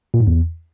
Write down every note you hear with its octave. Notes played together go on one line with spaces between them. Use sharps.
A#2
G#2
E2